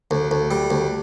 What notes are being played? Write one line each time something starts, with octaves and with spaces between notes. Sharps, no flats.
D2
D2
G3
D2